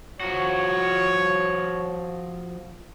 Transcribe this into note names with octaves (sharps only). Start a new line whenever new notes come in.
F3 F#4 C#5